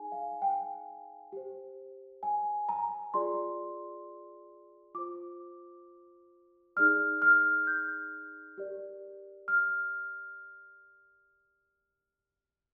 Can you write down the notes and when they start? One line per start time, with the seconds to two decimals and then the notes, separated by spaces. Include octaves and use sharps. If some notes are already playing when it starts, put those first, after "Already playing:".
Already playing: D#4 G#4 G#5
0.12 F5
0.42 G5
1.33 G4 C5
2.23 G#5
2.69 A#5
3.14 F4 G#4 D5 C6
4.95 F4 C5 D6
6.76 D#4 G#4 D5 F6
7.22 F6
7.67 G6
8.58 G4 A#4 D5
9.48 F6